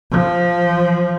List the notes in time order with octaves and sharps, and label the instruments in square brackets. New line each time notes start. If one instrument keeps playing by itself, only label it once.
[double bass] F3